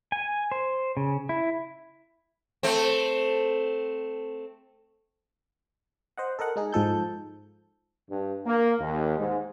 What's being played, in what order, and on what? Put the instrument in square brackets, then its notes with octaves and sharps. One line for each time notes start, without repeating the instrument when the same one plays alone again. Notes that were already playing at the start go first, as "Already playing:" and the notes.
[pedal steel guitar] G#5
C5
C#3
E4
[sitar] A3 C4
[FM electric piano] C5 D#5 F#5
A4 A#4 D#5 F#5
G#3 D#4 G#4
G#2 F3 A4 G6
[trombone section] G2
A#3
D#2
G#2